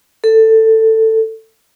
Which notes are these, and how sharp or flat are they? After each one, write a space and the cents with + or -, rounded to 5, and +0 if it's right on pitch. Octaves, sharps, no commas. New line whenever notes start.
A4 +15